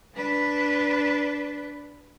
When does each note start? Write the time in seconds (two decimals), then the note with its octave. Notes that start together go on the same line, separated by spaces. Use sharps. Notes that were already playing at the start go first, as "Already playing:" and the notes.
0.15 D4 B4